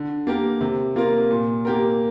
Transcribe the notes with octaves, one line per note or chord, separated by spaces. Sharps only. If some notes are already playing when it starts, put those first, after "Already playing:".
Already playing: D3
A#3 G4 A#4
C3
A#3 F4 A#4
A#2
A#3 G4 A#4